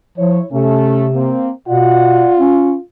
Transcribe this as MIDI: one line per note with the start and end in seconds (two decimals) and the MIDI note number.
0.18 0.40 53
0.18 0.45 64
0.18 0.45 73
0.52 1.34 48
0.52 1.07 57
0.52 1.07 61
1.14 1.51 58
1.14 1.51 60
1.68 2.25 47
1.68 2.82 65
1.68 2.42 74
1.68 2.42 78
2.39 2.75 61